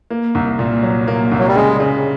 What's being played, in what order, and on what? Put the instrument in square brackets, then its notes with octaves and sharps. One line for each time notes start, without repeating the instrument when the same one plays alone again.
[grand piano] A#3
C2
A#2
F#3
A#3
C2
[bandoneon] F#3
G3
[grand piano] C#3 [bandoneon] G#3
[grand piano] C#3